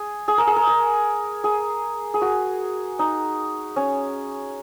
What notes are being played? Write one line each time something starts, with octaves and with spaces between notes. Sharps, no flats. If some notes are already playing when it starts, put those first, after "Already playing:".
Already playing: G#4
G#4
A#4
G#4
A#4
A#4
G#4
G#4
F#4
D#4
C#4